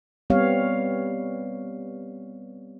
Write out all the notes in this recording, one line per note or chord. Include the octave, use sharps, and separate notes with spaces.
G3 B3 C4 G4 C#5 F5